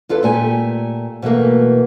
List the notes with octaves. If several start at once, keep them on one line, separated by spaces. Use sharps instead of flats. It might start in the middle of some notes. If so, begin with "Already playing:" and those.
E2 F4 A4 B4
A#2 A3 G4 G#5
B2 E3 A3 A#3